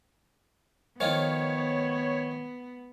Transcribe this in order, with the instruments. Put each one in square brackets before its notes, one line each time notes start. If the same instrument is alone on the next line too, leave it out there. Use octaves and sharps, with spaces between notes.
[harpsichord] D#3 F3 F4 [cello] B3 [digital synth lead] C#5